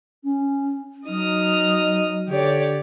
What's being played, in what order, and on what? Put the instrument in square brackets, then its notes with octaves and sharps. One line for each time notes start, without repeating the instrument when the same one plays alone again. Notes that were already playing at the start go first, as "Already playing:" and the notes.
[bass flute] C#4
[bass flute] F#3 [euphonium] D#4 [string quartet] D#5 D#6 F6
[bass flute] D3 [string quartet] G4 C#5 D5